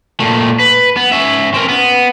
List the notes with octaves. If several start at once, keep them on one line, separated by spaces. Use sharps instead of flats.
A#2 A3
B4
B3
C#4 E5
C4 A#4
B3